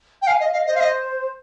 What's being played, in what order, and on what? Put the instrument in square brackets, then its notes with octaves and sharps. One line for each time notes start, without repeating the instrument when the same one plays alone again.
[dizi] G5
[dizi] F5 [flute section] G#5
[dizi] D#5 [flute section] F5
[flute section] D#5 [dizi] F5
[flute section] C5 [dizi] D#5
[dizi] F5
D#5